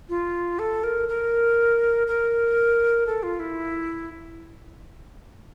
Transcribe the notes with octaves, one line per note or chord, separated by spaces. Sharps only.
F4
A4
A#4
A#4
A#4
A4
F4
E4